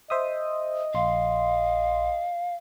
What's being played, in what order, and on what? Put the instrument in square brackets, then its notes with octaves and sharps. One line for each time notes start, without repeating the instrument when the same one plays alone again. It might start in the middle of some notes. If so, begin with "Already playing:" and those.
[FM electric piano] C5 E5 D#6 [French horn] D#5
[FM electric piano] A#1 C6 [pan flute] F5